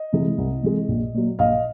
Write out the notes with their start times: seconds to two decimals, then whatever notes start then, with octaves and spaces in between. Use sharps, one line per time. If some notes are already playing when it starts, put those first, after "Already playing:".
Already playing: D#5
0.13 C3 E3 G#3
0.38 C2
0.63 C3 E3 G#3
0.88 A#1
1.14 A#2 F#3
1.39 A#1 D#5 F5